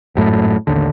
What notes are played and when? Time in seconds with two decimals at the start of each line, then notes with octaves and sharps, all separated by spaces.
0.15 G#1 F#2 A2
0.67 A1 D#2 D3